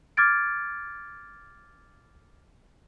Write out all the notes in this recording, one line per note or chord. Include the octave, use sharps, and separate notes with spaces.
D6 F6 G#6 A6 D7